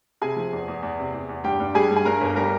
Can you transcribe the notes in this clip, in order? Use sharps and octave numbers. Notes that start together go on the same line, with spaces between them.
C3 G#4 G#5
F3
E2
E2
E2
C3
E2
E2
G2 G4 G5
G2
G3 G#4 G#5
G2
G#5
G2 A#4 A#5
G1
G3 A#4 A#5